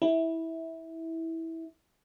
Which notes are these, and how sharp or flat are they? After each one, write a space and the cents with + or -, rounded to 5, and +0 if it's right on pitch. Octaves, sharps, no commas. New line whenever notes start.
E4 -15